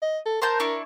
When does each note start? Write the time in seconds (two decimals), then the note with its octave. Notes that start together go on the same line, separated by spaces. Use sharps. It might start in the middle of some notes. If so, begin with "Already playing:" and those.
0.03 D#5
0.26 A4
0.42 A#4 C5 A5 G6
0.60 D4 E4 C#6